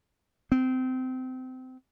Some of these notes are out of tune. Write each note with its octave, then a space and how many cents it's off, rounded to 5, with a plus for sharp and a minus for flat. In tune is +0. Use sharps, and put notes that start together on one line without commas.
C4 -25